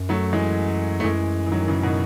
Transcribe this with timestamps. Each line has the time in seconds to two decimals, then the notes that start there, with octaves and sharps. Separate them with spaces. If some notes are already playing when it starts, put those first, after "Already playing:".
Already playing: F#2
0.09 F#3 A3
0.33 E3 G#3
1.00 A3
1.04 F#2 E3 G#3
1.46 E3
1.52 D#3 F#3
1.68 C#3 E3
1.83 B2 D#3